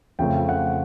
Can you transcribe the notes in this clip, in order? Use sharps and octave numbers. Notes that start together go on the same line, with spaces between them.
F2 C#3 F3 A3 G5
F#5